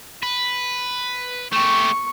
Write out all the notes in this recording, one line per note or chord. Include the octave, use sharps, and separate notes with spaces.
B4
A3 G4 C#6